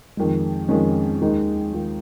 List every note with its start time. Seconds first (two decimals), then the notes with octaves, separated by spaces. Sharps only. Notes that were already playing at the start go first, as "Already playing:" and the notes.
0.17 F2 D#3 G#3
0.69 F2 D#3 G#3 C#4
1.22 D#2 D#3 G#3 D#4
1.73 D#3 G#3 F4